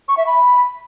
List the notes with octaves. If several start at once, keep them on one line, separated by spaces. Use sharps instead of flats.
C#6
E5
B5